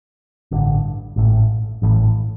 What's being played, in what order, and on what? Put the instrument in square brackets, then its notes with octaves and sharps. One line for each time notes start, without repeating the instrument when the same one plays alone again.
[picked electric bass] A1 G2 D3
A1 A2 A3
A1 A2 E3 A3